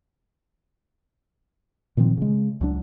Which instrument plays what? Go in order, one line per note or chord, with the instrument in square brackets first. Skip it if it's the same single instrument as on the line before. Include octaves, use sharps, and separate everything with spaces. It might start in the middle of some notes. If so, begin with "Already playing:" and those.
[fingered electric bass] A#2 D#3 F3 C4
C#3 G#3
C#2 F#3 D4